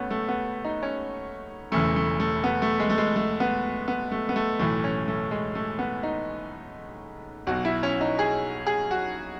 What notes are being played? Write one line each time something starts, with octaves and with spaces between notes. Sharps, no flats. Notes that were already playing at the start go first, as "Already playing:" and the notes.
Already playing: C#2 A3 B3 C#4
A3
B3
D#4
C#4
E1 E2 C#3 E3 A3
A3
A3
B3
A3
G#3
A3
G#3
A3
B3
B3
A3
B3
A3
B1 A2 E3 A3
C#4
A3
G#3
A3
B3
D#4
B1 B2 F#4
E4
C#4
D#4
G#4
G#4
F#4